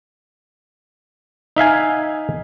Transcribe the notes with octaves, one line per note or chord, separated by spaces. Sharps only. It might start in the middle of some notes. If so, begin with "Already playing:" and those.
D#4 E5 F5 G#5